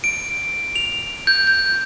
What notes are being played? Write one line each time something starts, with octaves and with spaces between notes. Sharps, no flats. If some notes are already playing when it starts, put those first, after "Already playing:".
D7
F7
G6
G6